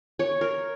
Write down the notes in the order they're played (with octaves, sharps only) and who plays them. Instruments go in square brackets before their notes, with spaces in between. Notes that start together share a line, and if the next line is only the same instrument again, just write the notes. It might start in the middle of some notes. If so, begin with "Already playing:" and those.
[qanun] C#5
A#4